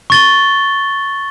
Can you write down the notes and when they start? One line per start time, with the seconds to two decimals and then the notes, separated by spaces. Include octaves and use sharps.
0.10 C#6 A6 G7